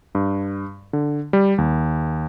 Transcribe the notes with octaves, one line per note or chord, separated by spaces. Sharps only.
G2
D3
G3
D#2